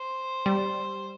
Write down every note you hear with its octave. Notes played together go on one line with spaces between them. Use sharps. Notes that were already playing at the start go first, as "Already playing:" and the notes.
Already playing: C5
G3